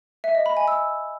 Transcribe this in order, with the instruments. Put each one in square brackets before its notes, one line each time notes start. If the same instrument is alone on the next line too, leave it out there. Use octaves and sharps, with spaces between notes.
[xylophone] E5
D#5
B5
G#5
E6